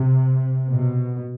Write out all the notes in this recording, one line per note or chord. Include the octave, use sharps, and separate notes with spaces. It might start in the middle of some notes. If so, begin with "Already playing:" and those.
Already playing: C3
B2